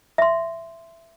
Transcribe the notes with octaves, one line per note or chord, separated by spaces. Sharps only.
E5 C6